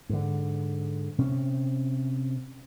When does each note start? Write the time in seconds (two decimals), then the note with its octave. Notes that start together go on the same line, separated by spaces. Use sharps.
0.09 G#2 D3
1.18 C3 C#4